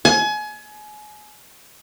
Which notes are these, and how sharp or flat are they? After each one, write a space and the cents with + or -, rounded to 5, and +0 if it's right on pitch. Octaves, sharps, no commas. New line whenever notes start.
G#5 +30